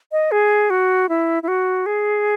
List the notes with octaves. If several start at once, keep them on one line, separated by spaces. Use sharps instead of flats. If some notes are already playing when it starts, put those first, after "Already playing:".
D#5
G#4
F#4
E4
E4
F#4
G#4